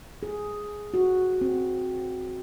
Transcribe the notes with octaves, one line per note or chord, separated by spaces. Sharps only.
G#4
F#4
C4